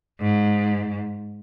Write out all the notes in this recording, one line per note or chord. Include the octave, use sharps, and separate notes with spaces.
G#2